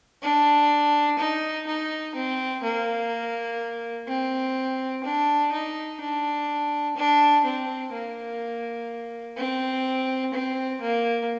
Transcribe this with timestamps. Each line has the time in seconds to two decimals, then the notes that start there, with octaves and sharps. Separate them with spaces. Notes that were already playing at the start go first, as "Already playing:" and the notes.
0.22 D4
1.19 D#4
1.67 D#4
2.15 C4
2.63 A#3
4.07 C4
5.04 D4
5.52 D#4
6.00 D4
6.96 D4
7.45 C4
7.92 A#3
9.37 C4
10.33 C4
10.81 A#3